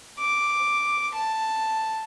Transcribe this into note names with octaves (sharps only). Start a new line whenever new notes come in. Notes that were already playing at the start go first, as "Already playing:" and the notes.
D6
A5